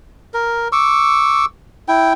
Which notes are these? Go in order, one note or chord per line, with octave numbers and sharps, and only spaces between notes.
A#4
C#6 D6 E6
E4 G5